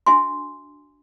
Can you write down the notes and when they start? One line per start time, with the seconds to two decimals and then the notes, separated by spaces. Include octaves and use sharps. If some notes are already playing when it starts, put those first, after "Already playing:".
0.06 D4 F#4 E5 G#5 C6